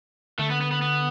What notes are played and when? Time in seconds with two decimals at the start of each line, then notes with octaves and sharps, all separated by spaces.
0.39 D3 A3
0.50 B3
0.61 B3
0.71 B3
0.82 B3